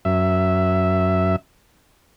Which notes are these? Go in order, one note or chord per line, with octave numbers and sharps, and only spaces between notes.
F#2 E5